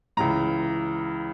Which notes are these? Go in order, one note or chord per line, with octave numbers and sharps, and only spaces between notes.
C#2 C#3 E3 A#5